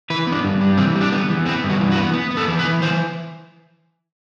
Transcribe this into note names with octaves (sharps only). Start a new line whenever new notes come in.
E3 B4
B3
D4
G2
G3
E3 C4
G3
D4
B3
E3
B3 C4
G2
F#4
E3
F#4
B3
B3
B3
A4
E3
B4
E3
E3 C5